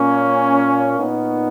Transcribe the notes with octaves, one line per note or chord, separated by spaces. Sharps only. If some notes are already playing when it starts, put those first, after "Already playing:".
Already playing: A#2 A#3 C#4
A#2 B3 D#4